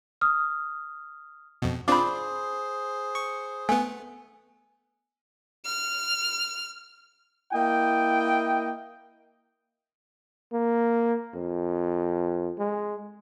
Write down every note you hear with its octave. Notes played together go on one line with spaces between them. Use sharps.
D#6 F6
F2 B2
C4 D4 F4 G#4 C5 B5 D6
C#6
A3 B3 G#5
F6
A#3 E4 D#5 G5
A#3
F2
G#3